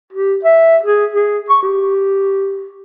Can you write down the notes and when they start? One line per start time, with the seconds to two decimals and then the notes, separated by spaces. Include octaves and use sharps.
0.13 G4
0.44 E5
0.83 G#4
1.13 G#4
1.50 C#6
1.63 G4